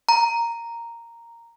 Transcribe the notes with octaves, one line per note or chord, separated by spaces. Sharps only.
A#5